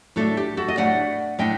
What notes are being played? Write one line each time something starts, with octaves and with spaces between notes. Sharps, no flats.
A2 A3 D4 F#4 A4
G4
F#4 A4
D#5
A2 A3 D4 D5 F#5
A2 A3 D4 D#5 G5